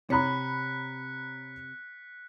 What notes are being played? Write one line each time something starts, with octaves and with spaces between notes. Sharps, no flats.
C3 C#5 A#5 B5 F#6 B6 C#7